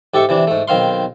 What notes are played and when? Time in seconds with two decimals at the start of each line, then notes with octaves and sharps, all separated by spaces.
0.14 G#2 G4 A4 E5 C#6
0.29 C3 E3 D4
0.47 G#2 A3
0.68 B1 D#3 C4 F5 C6